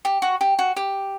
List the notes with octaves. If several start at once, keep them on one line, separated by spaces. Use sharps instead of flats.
G4
F#4
G4
F#4
G4